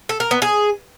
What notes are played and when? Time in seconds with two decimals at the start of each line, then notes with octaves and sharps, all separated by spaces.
0.09 A4
0.20 A#4
0.31 B3
0.42 G#4